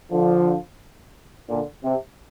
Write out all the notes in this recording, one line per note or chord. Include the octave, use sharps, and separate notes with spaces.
D3 F3
A#2 D3
C3